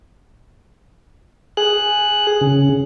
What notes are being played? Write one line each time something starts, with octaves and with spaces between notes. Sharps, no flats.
G#4 F#6
C#3